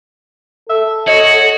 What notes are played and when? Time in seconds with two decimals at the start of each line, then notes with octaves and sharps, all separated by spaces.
0.69 A4 E5
1.08 F#4 C#5 D#5